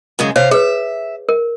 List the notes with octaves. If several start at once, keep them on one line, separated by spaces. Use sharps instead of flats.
F#2 C#3 G#3
C3 C5 C#5 F5
G#4 B4 E5
A#4